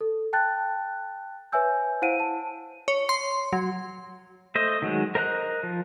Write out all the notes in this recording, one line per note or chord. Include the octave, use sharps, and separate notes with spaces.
A4
G5 A5 F#6 A6
B4 C#5 E5 G#5 E6 G6
E4 C5 F5 F#5 D7 D#7
A5
C#5
C6
F#3
A3 C5 D#5
D#3 F#3 G#3
A#4 C5 D#5 A#5 F#6
F3